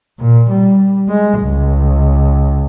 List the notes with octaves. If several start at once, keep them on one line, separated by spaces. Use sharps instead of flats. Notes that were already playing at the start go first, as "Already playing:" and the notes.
A#2
G3
G#3
C#2